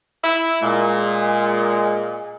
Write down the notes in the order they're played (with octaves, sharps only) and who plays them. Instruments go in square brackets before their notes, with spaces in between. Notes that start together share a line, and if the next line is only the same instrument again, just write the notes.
[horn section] E4
[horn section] A#2 [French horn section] G#3